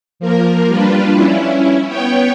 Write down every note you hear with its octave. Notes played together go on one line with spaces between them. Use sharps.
F3 A#3 A#4
G3 D4 F4 B4
C#4 E4
B3 C#5 G5